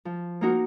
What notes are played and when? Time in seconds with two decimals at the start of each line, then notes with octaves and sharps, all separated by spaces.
0.05 F3
0.41 A#3 D#4 F#4 A#4